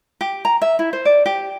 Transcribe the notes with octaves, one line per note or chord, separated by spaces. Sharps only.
G4
A#5
E5
E4
C5
D5
G4